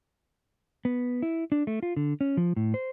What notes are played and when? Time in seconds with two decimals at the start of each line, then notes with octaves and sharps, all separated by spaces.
0.85 B3
1.22 E4
1.52 D4
1.67 A3
1.83 F4
1.97 D3
2.21 C#4
2.37 F3
2.56 A2
2.74 C5